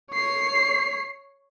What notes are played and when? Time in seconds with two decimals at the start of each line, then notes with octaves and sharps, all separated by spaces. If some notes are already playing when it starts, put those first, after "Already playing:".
0.12 C#5 C7